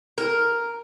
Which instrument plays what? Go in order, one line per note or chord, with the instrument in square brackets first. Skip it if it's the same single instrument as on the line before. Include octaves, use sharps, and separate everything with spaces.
[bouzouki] A#4